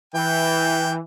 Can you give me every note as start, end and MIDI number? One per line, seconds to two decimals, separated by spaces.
0.14 1.01 52
0.14 0.91 79